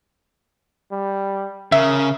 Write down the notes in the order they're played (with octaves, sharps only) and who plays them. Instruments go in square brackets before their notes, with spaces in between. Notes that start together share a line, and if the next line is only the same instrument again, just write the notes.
[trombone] G3
[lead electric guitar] C#3 [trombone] A#4 [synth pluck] E5